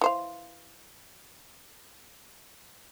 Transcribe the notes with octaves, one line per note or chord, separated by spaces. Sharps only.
E3 C5 F5